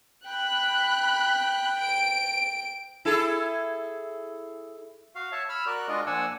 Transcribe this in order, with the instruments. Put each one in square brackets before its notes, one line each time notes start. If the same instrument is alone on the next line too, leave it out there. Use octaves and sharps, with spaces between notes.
[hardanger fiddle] G5 [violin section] B5 F#6
[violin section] D7
[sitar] E4 G#4 A4
[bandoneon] F#4 F5
C#5 E5 A5
B5 E6 F6
F#4 A#4 D5 F#6
G#3 D4 F4 F#4 D5 D#5
A#2 F3 D4 F#5 G#5 E6